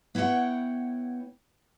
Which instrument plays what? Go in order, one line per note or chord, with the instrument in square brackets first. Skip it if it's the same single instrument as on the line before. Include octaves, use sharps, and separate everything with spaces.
[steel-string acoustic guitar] B3 E4 C#5 F#5 G5